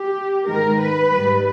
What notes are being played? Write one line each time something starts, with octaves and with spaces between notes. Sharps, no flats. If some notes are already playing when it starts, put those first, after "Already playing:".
Already playing: G4
G#2 D#3 G#3 A#4
B4
G#2 G3